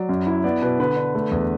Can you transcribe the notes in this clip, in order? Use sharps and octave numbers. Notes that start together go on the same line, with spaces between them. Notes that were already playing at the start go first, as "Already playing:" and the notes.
Already playing: F#3 D5
F#2
E4
B3 D5
B2 B4
D3 B4
D4
A3
E2